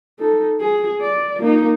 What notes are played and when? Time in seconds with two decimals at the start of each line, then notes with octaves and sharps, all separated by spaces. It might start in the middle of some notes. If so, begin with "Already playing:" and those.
0.19 D#4 A4
0.60 G#4
1.01 D5
1.39 A#3 D#4